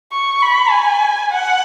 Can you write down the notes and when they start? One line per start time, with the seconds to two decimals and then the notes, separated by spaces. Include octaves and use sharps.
0.13 C#6
0.42 B5
0.72 G#5
1.32 F#5